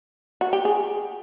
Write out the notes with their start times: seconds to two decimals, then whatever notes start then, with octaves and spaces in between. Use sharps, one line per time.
0.41 F#4
0.53 G4
0.65 G#4